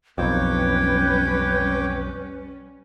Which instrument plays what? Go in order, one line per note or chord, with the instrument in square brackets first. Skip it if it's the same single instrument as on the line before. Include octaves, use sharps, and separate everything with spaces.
[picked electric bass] B1 F2 [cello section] G3 C#4 [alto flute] B4 [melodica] C#5 G5 D6